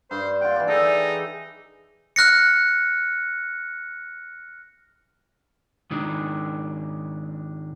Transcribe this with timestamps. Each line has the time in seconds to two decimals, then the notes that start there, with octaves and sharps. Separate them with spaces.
0.11 G2 C5
0.41 F4 F#5 G5
0.56 E3 D5
0.67 D#4 G#4 A4 G5
2.16 F6 F#6 A#6 C#7
5.91 G#2 D#3 D4